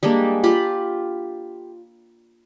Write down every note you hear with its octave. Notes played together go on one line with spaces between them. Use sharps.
G3 G#3 A#3 D4
F4 G4 B5